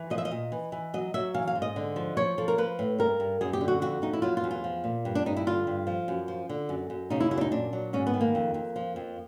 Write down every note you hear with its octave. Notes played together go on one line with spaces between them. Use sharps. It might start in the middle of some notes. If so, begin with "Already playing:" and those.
Already playing: E3
F3 D#5
E5
D#5
A#2
E3
E3
F#3 D#5
F#3 E5
E3 F5
F5
G#2
D#5
D3
F3
F3 C#5
F3 A4
A#4
F3 B4
A2
G2 A#4
G2
F#2 G#4
G4
D3
F#4
F2 F#4
F2 D#4
E4
F#3 F4
F4
E2
F4
F3
A#2
G2
D4
G2 D#4
E4
D3 F4
G2
F3
F#2
F3
D3
F#2
F#2
C#3 D#4
E4
F#2 E4
D4
D#4
A#2 D4
F#3
G#2 C#4
B3
D#3
A#3
F2
F2
F3
F2